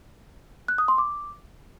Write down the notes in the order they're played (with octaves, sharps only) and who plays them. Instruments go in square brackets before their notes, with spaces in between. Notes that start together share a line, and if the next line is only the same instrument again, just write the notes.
[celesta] F#6
D#6
C6
D6